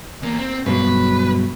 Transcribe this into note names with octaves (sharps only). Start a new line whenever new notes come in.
E2 A#3
C4
G2 B2 F#3 B4